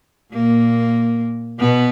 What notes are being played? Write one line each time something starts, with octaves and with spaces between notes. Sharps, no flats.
A#2 A#3
B2 B3